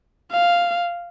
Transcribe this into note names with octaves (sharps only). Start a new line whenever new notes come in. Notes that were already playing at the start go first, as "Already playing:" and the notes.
F5